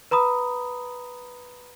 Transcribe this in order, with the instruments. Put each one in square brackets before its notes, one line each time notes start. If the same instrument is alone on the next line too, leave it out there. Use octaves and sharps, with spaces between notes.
[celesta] B4 A#5 B5 D#6